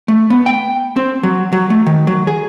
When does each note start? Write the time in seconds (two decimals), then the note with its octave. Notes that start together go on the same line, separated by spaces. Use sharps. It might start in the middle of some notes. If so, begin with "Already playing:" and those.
0.08 A3
0.30 B3
0.46 G5
0.96 C4
1.23 F#3
1.53 F#3
1.70 A3
1.86 D#3
2.07 F#3
2.27 G#4